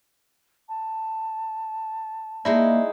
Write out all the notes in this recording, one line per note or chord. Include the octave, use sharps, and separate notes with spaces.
A5
G#3 A#3 D#4 E4 D5 E5